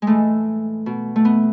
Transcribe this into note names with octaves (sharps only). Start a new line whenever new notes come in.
G#3
A2 E3 A3
B2
A3
B3